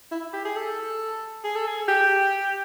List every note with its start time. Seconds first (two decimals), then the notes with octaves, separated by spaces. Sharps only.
0.11 E4
0.33 G4
0.45 G#4
0.56 A4
1.44 G#4
1.55 A4
1.66 G#4
1.88 G4